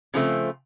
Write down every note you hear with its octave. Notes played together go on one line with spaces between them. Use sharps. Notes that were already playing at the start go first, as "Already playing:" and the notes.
C#3 F3 A3 C4